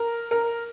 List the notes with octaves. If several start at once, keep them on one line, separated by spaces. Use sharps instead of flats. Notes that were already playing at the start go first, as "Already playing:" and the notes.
Already playing: A#4
A#4